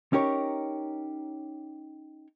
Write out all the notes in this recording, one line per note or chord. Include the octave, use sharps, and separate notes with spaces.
C#4 D#4 G4 A#4 C#5